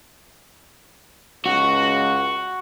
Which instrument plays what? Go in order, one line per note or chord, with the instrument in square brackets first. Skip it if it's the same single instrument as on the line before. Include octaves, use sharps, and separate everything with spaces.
[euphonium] C#2 [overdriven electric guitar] F#4